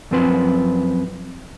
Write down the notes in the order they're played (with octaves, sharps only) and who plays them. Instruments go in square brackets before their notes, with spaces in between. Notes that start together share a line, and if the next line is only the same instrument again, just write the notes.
[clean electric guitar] F#2 F3 C4 B4 C6